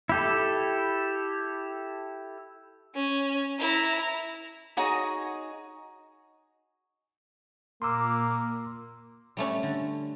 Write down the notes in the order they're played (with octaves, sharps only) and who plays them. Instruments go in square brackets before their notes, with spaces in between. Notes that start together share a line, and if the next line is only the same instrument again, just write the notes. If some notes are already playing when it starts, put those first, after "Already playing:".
[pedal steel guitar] E4 G4 A4
[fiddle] C#4
E4 A#5
[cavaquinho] D#4 F#4 G#4 C#5
[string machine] A#2 [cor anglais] A#3 [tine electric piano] C6 D6 E6
[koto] G3 A3 C#4
D3